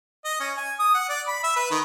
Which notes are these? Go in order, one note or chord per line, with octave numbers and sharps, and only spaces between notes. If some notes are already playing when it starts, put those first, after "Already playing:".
D#5
C#4
G#5
D#6
F#5
D5
B5
E5
B4
D#3